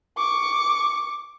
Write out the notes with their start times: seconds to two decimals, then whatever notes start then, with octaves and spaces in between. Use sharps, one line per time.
0.17 C#6 D6